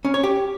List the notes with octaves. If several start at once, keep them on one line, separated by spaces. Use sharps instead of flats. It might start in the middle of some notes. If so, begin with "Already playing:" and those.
C#4
C#5
G4